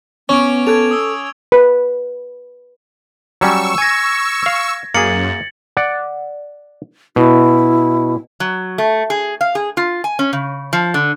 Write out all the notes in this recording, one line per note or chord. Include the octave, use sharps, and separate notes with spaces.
B3 C#4 C#6 D6 D7
A4 B4 G#6 D7 F7
D#6 E6
B4
F#3 G3 C#4 C#6 E6
G#5 G#6 A#6
F5
F#2 A#3 G#4 A6 C#7 F#7
D5 F#5
B2 E4
F#3
A3
G#4
F5
G#4
F4
G#5
C#4
C#3
F3
D3